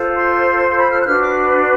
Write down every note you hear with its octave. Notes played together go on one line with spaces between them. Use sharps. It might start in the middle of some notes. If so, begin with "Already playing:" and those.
Already playing: F4 A4 C5
C6
C6
B5
F6
F#6
D4 F#4 B4 F6
D6